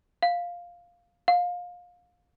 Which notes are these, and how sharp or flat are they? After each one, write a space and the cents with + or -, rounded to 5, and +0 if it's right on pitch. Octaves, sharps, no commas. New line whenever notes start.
F5 +5
F5 +25